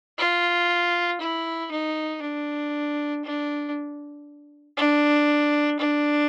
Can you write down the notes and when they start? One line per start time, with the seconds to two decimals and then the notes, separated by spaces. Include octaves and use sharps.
0.18 F4
1.20 E4
1.71 D#4
2.22 D4
3.24 D4
4.77 D4
5.79 D4